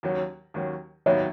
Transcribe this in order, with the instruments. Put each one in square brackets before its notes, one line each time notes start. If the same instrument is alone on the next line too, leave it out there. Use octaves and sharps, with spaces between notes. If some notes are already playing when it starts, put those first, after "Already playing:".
[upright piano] D#2 D#3 F#3 C#4
D#2 D#3 F#3 C#4
[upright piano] D#2 D#3 F#3 B3 D#4 [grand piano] C#5 E5